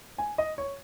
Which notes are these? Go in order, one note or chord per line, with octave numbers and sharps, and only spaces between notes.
G#5
D#5
C#5